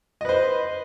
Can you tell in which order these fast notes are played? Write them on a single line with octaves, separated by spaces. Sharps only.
D#5 B4 C5